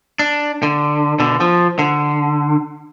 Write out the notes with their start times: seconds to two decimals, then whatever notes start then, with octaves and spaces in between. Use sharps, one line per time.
0.19 D4
0.63 D3
1.20 B2 D3
1.40 F3
1.79 D3